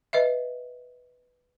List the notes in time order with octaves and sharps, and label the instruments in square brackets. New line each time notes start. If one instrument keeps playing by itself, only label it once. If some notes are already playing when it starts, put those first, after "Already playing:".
[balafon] B4 D#5 E5